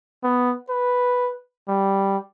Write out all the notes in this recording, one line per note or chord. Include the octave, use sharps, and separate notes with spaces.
B3
B4
G3